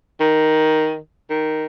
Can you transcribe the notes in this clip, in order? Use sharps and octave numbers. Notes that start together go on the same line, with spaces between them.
D#3
D#3